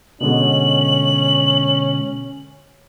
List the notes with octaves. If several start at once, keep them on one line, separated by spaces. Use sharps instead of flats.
B2 D3 G#3 C#4 F#7